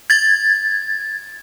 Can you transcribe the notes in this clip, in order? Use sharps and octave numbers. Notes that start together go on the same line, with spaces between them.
G#6 A6